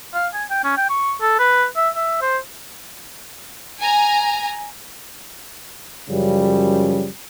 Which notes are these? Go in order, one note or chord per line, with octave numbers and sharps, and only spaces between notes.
F5
G#5
G5
C#4
G5
C#6
A4
B4
E5
E5
C5
G#5 A#5
F#2 C#3 F3 G3